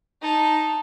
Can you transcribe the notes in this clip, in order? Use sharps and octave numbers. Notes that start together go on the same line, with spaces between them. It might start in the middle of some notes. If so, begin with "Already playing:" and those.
D#4 A5